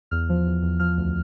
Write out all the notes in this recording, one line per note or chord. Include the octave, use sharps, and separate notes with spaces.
E2 F6
F3
E2
E2
F3 F6
D2